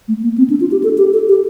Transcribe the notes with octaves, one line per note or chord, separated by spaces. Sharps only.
A3
A#3
C4
D4
F4
G4
A4
G4
A4
G4